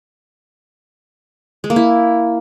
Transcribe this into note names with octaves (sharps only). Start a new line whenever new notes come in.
G#3
A#3
E4